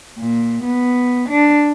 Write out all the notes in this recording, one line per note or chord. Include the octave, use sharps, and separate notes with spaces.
A#2
B3
D4